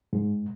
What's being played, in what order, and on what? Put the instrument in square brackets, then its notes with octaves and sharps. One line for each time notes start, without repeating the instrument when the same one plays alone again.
[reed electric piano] G#2